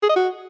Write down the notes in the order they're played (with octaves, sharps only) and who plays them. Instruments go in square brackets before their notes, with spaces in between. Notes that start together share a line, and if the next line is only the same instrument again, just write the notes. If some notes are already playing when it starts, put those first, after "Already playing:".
[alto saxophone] G#4
D#5
F#4